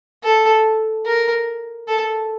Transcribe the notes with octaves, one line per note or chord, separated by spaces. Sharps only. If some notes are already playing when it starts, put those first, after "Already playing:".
A4
A#4
A4